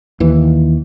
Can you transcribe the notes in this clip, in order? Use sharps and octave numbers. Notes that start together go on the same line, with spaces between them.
D#2 E3